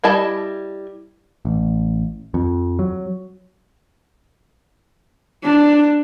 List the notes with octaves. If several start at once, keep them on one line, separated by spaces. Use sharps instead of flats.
G3 E4 D#5 A5
A1
F2
F#3
D4